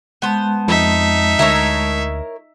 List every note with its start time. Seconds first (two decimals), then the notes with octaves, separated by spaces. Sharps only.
0.22 G#3 B3 C5 A5
0.68 F2 D#4 E5
1.39 D2 E4 A#4 C#5